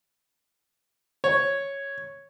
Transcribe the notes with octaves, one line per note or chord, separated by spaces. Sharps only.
C#5